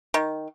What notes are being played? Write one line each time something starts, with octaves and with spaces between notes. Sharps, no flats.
D#3